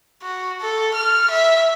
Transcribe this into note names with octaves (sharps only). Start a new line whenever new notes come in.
F#4
A4
F6
E5